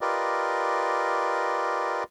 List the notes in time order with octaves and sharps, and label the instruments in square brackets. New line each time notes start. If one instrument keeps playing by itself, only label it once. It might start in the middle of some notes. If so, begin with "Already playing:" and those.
[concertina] F4 G4 A#4 B4 D5 D#5